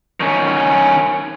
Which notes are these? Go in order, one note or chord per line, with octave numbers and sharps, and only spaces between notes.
D#3 C#4